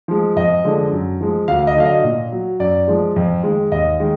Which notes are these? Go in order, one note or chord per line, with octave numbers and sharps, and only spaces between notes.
F3 G#3
F2 D#5
D3 F3 G#3
F#2
F3 G#3
D2 F5
D#5
D3 F#3 F5
D#5
A#2
F#3
F#2 D5
F3 G#3
F2
D#3 G#3
D#2 D#5
D#3 G#3